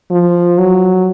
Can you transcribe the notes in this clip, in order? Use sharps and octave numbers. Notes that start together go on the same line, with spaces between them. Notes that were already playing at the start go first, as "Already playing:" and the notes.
F3
F#3